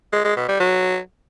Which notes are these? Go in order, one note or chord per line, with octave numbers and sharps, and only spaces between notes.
G#3
G#3
B2
G3
F#3